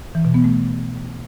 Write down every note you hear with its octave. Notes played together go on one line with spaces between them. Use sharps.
E3
B2
B3
A3